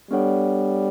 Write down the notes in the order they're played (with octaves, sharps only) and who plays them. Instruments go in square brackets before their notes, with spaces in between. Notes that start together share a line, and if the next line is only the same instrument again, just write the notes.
[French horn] G3 [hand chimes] B3 D4 A4 C#5 F#5